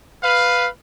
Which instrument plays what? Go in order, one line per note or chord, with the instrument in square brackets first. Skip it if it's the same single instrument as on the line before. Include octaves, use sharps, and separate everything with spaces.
[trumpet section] B4 F5